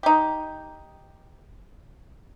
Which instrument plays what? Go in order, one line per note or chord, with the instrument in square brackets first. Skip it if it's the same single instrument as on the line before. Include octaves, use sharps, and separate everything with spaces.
[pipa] D#4 G4